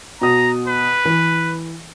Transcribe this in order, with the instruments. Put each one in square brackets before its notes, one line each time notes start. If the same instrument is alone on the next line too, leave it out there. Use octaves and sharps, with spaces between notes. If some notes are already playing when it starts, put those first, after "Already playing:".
[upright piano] B2 D#6 [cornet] A#5
[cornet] B4
[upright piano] E3